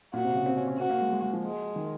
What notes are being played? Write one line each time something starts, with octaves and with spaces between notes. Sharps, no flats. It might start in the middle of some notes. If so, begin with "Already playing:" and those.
A#2 F#4
C3
C#3
C4
C#4
C#4
C4 F#4
A#3
G#3
G#3
G#3
F3
G#3
D#3